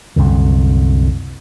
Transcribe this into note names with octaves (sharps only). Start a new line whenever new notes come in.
C2 F#2 D3